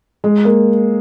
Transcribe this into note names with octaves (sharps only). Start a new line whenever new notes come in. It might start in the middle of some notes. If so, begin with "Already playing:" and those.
G#3
A#3